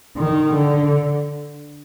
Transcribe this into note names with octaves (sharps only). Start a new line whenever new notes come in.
D#3
D3